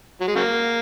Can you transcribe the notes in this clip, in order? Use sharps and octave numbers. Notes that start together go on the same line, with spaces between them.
F#3
G#3
C#3 F#3 A#3